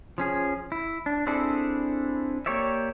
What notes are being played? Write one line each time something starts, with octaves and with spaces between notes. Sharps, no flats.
F3 C#4 G#4
E4
D4
C4 D4 E4 G#4 A4
A#3 G4 C#5 D5 E5